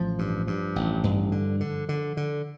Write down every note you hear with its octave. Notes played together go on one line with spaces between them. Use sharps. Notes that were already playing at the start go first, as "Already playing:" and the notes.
Already playing: A1 F3
G2
G2
A1
G2
D3
D3
D3
D3